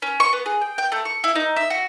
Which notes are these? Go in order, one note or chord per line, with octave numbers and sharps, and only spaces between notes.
C#4
C#6
B3
G#4
G5
G5
A3
C#6
E4
D#4
E5
F#4